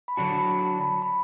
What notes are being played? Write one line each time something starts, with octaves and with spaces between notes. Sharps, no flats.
B5
D3 F#3 D4 F#4 A5
B5
A5
B5
B5